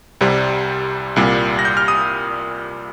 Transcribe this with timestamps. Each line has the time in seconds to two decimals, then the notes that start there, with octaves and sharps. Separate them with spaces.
0.21 C2 C3 G3
1.16 C2 A#2 G3
1.59 A#6
1.65 G6
1.77 F6
1.88 D#6